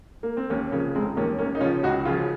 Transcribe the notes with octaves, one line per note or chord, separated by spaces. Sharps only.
A#3
C4
D#2 A#3 C#4
C#3 F3 A#3 C#4
F1 G#3 C4
D#2 D#3 A#3 C#4
D#2 A#3 C#4
D#4
C#3 F3 C#4 F4
C#2 D#4 F#4
C#3 F3 C#4 F4